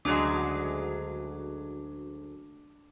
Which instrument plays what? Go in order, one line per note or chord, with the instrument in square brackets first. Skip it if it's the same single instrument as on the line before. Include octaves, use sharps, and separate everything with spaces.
[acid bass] D2 [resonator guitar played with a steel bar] C#3 F#3 G#3 [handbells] D4 D6